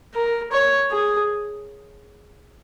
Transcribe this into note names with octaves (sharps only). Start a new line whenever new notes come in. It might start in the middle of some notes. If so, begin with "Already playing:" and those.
A#4
C#5
G#4